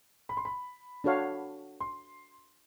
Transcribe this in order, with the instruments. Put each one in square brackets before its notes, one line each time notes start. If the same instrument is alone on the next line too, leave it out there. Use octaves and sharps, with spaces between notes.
[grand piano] B5
C6
B5
[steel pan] D4 F#4 A4 C#5 F5
[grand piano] C6